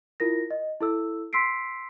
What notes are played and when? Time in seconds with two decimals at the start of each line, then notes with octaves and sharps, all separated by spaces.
0.20 E4 F4 A#4 A#6
0.51 D#5
0.81 E4 A4 E6
1.33 C6 E6 B6 C7 D7